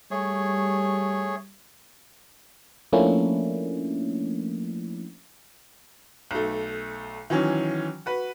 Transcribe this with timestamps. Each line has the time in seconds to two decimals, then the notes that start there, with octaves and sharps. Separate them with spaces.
0.11 G3 A3 G#4 C#5
2.93 F3 A3 A#3 C#4 D4 E4
6.31 B1 A3
7.30 D#3 E3 F#3 C#4
8.06 F#4 B4